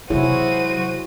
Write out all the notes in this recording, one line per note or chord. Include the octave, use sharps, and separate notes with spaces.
C3 F#3 E4 F#4 G#4 C5 C#5 D#7